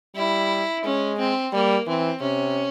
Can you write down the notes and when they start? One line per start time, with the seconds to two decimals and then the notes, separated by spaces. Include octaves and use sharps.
0.16 G3 E4
0.84 G#3 C#4
1.18 C4
1.53 G3 A#3
1.87 E3 C4
2.21 C3 C#4